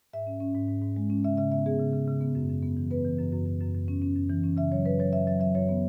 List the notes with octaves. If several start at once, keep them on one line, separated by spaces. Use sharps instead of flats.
G#2 E5
C#4
C#4
G#2
G#2
G#2
G#3
C#4
C#3 E5
C#3 E5
B3 E5
B3 G#4
C#3
C#3
C#3
B3
F#2
F#2
B3
E3
B3 B4
E3
F#2
F#2
F#2
F#2
F#2
C#4
C#4
F#2
E3
C#4
C#3 E5
F#3 C#5
F#2 B4
F#3 C#5
F#2 E5
F#3 E5
F#3 E5
F#2 C#5
B3